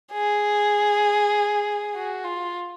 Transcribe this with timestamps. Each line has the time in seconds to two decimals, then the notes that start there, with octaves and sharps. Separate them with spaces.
0.13 G#4
1.95 F#4
2.24 F4